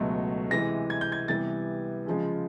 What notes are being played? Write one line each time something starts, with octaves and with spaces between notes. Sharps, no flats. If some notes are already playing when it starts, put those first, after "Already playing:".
Already playing: C#2 B2 F#3 A3
C3 E3 G#3 A#6
G#6
G6
G#6
C3 E3 G3 B3 A6
C#3 F3 G#3